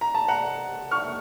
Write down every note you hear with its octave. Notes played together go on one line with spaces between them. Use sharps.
A#5
A5
F#5 A#5
C#6 F6